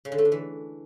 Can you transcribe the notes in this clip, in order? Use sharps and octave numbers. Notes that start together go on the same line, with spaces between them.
C#3
D3
A3
D4
E3